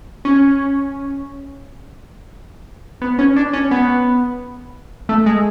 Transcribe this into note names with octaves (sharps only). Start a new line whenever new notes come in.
C#4
B3
C#4
D4
C#4
B3
A3
G#3